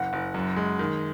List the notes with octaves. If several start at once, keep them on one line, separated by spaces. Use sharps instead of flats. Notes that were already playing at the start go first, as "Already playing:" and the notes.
Already playing: F#1 F#5
F#1
F#2
G#3
D#3